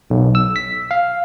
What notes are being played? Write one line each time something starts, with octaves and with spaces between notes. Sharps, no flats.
B1
E6
B6
F5